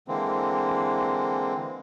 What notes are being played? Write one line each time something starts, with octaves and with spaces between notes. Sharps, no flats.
D3 E3 G#3 A#3 C4